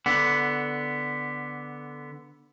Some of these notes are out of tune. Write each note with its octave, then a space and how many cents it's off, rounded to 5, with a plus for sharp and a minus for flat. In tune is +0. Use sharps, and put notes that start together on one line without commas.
D3 +0 B3 +0